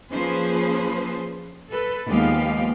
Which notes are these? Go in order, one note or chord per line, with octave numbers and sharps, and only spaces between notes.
F3 A#3 C#4 G#4 B4 C5
A4 B4
D#2 F3 G#3 B3 G4 F5